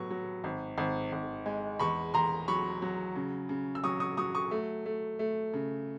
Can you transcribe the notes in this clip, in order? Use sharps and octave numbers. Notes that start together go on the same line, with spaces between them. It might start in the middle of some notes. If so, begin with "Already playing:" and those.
Already playing: A2 F#3 B3 C#6
F#3
G#1
G#1
G#1
G#3
E2 B5 C#6
E2 A#5 C6
F#3 B5 C#6
F#3
C#3
C#3
E6
F#3 C#6 D#6
C#6 D#6
F#3 C#6 D#6
C#6 D#6
A3
A3
A3
C#3